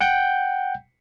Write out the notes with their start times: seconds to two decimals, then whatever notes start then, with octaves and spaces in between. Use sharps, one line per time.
0.01 F#5 G5 G6